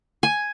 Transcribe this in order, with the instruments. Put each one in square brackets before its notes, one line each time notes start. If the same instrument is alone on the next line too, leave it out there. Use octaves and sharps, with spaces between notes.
[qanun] G#5